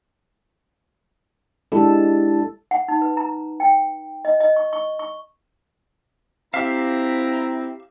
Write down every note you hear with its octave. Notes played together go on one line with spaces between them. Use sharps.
G#3 D4 E4 G4 A4
F#5
D#4
B4
A#5
G5
D#5
D#5
C#6
C#6
C#6
C4 E4 G4 E5 F5 A#5